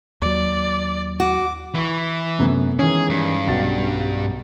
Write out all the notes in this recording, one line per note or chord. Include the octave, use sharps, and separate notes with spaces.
D#2 F#3 D5
F#4 D6
E3 E4 C#6
F#2 C3 A3 B3
D#3 E3 G#3 C#4 G#4
G2
B1 F#4 A6